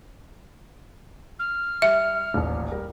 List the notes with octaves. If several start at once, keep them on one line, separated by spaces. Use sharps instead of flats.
F6
G3 E5
D#1 A1
G3 A#4